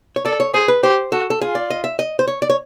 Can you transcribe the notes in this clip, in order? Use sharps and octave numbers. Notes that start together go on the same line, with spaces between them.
C#5
A4 D5
C#5
G#4 C5
B4
G4 C5
F#4 A4
A4
F4 G#4
D5
D#5
E5
D#5
C5
C#5
D5
C#5